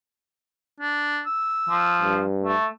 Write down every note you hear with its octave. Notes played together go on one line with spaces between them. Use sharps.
D4
E6
F3
G2
A3